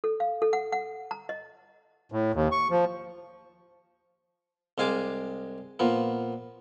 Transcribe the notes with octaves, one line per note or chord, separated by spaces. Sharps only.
A4
F5
A4
F#5
F#5
A#5
D#5
A2
D#2
C#6
F3
C2 G#3 F5 G#5 A5 D6
A#2 F3 B3